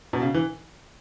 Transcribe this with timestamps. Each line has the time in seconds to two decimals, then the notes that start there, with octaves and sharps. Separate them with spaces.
0.13 B2
0.22 C#3
0.34 E3